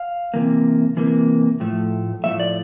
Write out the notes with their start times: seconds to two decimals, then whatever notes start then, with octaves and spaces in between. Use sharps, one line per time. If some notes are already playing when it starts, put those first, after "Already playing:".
Already playing: F5
0.34 C3 E3 A#3
0.97 C3 E3 A#3
1.60 A2 F3 A3
2.24 A2 F3 A3 E5
2.40 D5